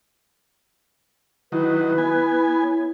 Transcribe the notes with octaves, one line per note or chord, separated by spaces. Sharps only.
D#3 F#3 E4 B4
B3 G#5
C#5